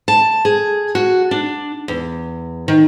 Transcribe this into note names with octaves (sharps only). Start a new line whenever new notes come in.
A5
G#4
F#4
D4
E2
D#3